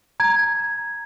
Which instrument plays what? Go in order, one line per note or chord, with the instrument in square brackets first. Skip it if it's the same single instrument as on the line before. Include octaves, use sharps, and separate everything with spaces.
[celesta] A#5 G#6